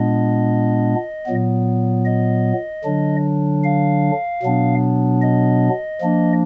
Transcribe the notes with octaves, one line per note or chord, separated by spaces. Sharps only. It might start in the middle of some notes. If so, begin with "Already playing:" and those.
Already playing: A#2 G#3 B3 D4 D#5
A#2 F#3 B3
D#5
D3 F#3 D4
F5
B2 F#3 B3 D4
D#5
F3 A#3 D4